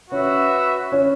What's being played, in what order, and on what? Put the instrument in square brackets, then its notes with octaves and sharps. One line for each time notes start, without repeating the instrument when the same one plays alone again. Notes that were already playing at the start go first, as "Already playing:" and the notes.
[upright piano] C#4 [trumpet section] F#4 B4 E5
[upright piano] C#4